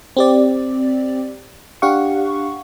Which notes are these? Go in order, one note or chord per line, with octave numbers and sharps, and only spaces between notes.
C4 G4 D5
D4 G4 F5 F#5 C#6